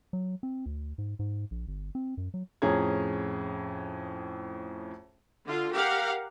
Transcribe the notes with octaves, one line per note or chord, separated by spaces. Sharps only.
F#3
C4
D2
G#2
G#2
A#1
G1
C4
F#2
F#3
F2 A2 C#4 G#4 A#5 G#6
D3 F4
G4 A#4 F5 F#5